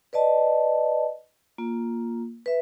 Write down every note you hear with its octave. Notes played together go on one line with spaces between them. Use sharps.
B4 D5 D#5 A5
A#3 F4
B4 E5